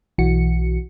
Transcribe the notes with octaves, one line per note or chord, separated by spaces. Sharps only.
B1 E3 F#4 C#7